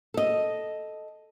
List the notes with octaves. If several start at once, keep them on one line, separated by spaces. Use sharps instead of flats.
A4 D#5